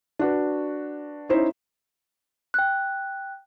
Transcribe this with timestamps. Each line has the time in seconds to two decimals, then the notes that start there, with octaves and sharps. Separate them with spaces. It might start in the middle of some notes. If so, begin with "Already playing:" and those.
0.19 D4 F#4 B4
1.29 C#4 D#4 E4 C5
2.54 G5 F#6